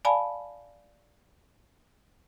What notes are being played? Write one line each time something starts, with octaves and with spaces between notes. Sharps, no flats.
D5 F5 G#5 A5 B5